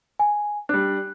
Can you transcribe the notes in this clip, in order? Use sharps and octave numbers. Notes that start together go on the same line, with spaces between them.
G#5
G3 D4 F#6